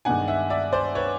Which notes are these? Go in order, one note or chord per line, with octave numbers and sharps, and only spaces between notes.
G2 D#3 G#3 B3 D4 F#5 G#5
E5 F#5
D5 E5
C5 D5
B4 C#5